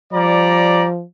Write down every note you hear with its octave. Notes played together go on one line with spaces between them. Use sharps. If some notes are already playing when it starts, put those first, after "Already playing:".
F3 G3 D5 A#5